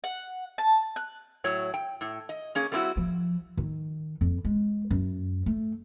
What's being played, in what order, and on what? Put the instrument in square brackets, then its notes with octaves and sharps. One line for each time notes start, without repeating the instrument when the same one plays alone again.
[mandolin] F#5
A5
F#6
[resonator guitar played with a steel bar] A2 F#3 C#5
G5
A2
D#5
A#3 C#4 G#4
G3 A3 C4 D#4 E4 F#4
[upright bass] F3
D#3
F2
G#3
F#2
A3